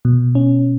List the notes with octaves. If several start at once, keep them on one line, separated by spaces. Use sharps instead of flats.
B2
C#4